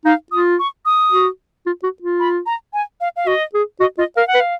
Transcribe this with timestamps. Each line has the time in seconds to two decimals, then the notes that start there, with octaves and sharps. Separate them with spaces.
0.05 D#4 F5
0.32 F4 D#6
0.59 C#6
0.86 D#6
1.12 F#4
1.66 F4
1.83 F#4
2.02 F4
2.20 B5
2.46 A#5
2.73 G#5
3.01 F5
3.16 F5
3.26 F#4 D#5
3.54 G#4
3.80 F#4 D#5
3.98 F4 D#5
4.16 A#4 F5
4.28 F#5
4.34 B4
4.40 F5